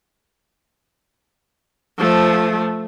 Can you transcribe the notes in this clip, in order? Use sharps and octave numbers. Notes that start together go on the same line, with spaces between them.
F3 A3